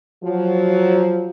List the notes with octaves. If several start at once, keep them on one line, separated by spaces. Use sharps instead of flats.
F3 F#3